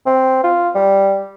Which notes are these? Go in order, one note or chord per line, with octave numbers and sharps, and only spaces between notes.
C4
F4
G3